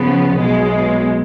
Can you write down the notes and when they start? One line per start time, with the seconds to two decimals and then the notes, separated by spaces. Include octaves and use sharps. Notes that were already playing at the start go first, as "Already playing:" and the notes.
Already playing: C#3 F3 B3
0.36 B1 B2 G#3